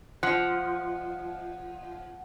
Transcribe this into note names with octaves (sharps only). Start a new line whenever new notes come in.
F3 F#5